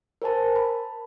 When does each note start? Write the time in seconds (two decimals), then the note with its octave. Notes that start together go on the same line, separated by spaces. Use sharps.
0.22 A#4 C5 G#5 A5
0.56 B5